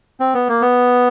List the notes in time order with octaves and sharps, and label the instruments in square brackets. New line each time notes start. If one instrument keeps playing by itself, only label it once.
[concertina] C4
B3
A#3
B3